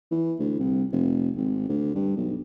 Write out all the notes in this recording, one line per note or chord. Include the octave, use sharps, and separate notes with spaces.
E3
D2
C2
F1
G#1
D2
G2
B1